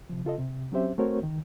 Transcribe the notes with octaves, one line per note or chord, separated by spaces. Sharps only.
C3 F3
C#3 F4 A4 D#5
C3
F#3 C4 C#4 G4 C5 E5
A3 C4 F#4 A#4 C5 C#5
C#2 D#3